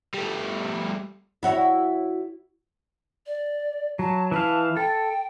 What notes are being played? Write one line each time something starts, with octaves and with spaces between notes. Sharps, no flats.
G3 A3
E4 F#4 C#5
D5
F#3 A5
E3 E4 F5 A5
A4 G5